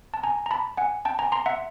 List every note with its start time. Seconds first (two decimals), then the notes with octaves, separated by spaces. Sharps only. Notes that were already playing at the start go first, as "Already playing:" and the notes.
0.14 A5
0.24 G#5 A#5
0.46 A#5
0.51 A5 B5
0.77 F#5 G#5
1.05 G5 A5
1.19 G#5 A#5
1.32 A#5 C6
1.46 E5 F#5